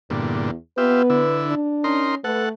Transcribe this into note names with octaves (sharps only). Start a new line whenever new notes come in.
E2 G2 A#2 D3
B3 F4 G4 B4 E5
D3 E4
D4
C#4 D#4 A#4 C6
A3 A4 B4 F#5